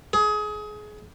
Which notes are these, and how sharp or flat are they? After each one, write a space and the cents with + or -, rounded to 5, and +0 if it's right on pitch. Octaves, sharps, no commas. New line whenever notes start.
G#4 +25